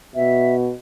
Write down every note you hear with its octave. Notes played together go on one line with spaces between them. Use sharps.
B2 E5